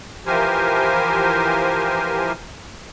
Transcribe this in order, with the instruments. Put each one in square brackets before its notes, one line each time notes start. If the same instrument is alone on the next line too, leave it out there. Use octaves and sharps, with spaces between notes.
[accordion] E3 F3 G4 A#4 C5 G#5